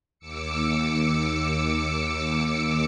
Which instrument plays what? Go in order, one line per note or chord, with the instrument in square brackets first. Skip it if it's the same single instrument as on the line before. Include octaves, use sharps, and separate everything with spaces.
[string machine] D#2 D6 E6 C#7